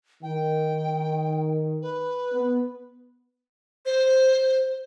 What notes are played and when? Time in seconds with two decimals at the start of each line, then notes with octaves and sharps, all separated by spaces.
0.23 D#3 G5
1.82 B4
2.33 B3
3.86 C5